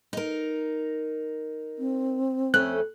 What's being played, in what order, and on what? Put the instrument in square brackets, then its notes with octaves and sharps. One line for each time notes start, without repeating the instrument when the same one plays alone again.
[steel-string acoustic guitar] D#4 A#4
[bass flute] C4
[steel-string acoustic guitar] F2 A3 C#4 [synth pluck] F#6